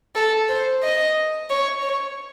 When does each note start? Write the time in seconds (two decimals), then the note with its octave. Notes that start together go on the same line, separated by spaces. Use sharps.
0.15 A4
0.48 C5
0.83 D#5
1.50 C#5
1.82 C#5